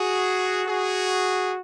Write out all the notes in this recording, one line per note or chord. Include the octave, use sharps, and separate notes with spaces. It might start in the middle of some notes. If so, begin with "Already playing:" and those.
Already playing: F#4 G#4
F#4 G#4